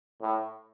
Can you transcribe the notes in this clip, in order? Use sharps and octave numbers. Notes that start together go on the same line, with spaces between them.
A2